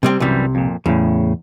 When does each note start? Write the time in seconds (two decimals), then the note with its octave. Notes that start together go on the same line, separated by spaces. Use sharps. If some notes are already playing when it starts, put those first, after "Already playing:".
0.03 C3 G3 C4
0.20 C2 F#2 C3 E3 G3
0.55 F2 A#2
0.86 E2 A2 C#3